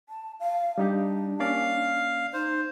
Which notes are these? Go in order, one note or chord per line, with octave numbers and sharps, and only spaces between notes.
A5
F5
G3 D4 D#4 G4
A#3 C#4 D5 F5
D#4 C5